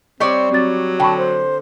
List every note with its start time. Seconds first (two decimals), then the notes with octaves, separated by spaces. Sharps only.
0.20 G3 C4 C#5 D5
0.51 F#3 C4 A6
1.00 D3 G5 A5 B5 C#6
1.18 C5